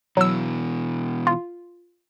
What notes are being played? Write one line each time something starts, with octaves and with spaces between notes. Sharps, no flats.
B2 E3 F#3 E6
F4